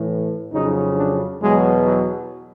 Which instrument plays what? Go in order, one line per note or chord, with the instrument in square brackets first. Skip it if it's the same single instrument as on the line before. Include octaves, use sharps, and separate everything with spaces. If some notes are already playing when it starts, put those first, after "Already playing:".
Already playing: [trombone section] A2 E3
F2 C#3 F#3 D#4
D4
E2 B2 F#3 G#3
F#3